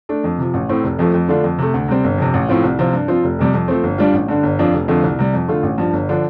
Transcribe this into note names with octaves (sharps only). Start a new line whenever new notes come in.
A3 D4
F2
C3 F3
A1
A2 A3 C4
F1
F2 F3 A3
F2
D3 A3 D4 F4
F2
C3 A3
D2
C3 G3 C4
G1
F2 C3
A1
A2 F3 C4 F4
C2
C3 F3 C4 F4
G2
F3 C4 F4
F1
F2 C3 G3
F2
F3 A3 C4
G1
G2 G3 D4 F4
A1
G2 D3
G1
F2 F3 D4 F4
F1
F2 D3 A3 F4
C2
C3 G3
F2
D3 A3 F4
A1
G2 F3
G1
D3 F3 D4